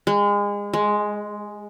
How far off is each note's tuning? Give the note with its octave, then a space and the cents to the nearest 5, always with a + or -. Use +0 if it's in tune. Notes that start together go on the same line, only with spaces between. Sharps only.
G#3 -30
G#3 +5